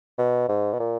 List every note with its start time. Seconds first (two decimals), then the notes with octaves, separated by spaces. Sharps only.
0.18 B2
0.49 G#2
0.73 B2
0.80 A#2